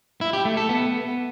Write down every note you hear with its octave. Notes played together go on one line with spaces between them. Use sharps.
E4
G4
A3
A4
B3